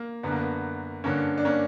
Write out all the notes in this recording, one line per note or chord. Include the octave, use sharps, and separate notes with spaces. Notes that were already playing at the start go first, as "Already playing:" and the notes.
Already playing: A#3
F#2 D3 B3
A#3
B3
G2 D3 A#3 C#4
D4
A#3 C#4